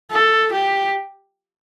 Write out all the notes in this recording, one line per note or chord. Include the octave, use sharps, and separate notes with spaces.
A4
G4